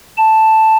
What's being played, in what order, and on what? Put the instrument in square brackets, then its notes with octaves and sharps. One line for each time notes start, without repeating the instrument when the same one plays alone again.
[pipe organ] A5